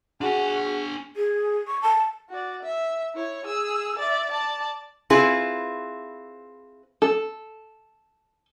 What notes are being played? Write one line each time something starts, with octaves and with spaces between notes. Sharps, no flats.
D4 F#4 G#4 G#5
G#4
C#6
A5
F#4 D5
E5
E4 C#5
G#4 E6
D5 E5
D5 A5
C4 E4 F4 G#4 B4
A4